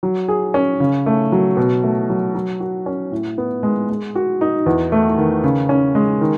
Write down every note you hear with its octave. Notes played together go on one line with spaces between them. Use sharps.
F#3
G#4
C#4
C#3
A3
F#3
B2
A3
F#3
F#3
F#4
C#4
A2
B3
G#3
G#3
F#4
D#4
E2
A3
D#3
C#3
C#4
G#3
D#3